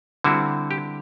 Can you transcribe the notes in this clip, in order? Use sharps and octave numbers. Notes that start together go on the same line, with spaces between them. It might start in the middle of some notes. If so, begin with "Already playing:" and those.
D3 G3 C4 E4 F#4
G4